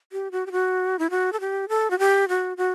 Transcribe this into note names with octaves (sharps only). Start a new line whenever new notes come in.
G4
F#4
G4
F#4
E4
F#4
A4
G4
A4
F#4
G4
F#4
F#4